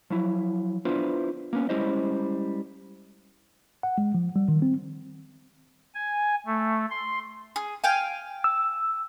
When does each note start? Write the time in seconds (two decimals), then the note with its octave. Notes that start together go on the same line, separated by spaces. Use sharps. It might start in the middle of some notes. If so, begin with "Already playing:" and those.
0.10 F3 F#3 E4
0.85 B3 D4 E4 F4 B4 C5
1.53 A#3 B3 C#4
1.69 G3 G#3 C#4 E4 C5 D#5
3.83 F#5
3.98 G#3
4.14 F3
4.36 G3
4.48 D#3
4.62 C4
5.95 G#5
6.46 A3
6.90 C6
7.56 G#4
7.84 F5 G5 G#5
8.44 E6